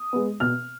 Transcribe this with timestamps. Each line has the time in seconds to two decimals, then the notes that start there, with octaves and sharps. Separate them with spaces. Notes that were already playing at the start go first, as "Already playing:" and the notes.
Already playing: D#6
0.13 G#3 B3
0.40 B2 F6